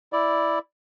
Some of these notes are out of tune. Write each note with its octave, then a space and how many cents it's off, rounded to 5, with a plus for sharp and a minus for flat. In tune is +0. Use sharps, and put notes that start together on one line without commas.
E4 +0 D5 +0